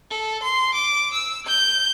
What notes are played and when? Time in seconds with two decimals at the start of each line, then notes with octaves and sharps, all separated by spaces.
0.11 A4
0.43 C6
0.75 D6
1.13 E6
1.46 G6